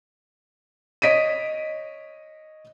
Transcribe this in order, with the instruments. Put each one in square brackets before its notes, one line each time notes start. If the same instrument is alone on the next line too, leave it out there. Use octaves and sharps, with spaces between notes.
[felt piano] C#5 D#5 B6 D7 D#7